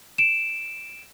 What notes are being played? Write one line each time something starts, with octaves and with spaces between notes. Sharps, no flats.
D7 E7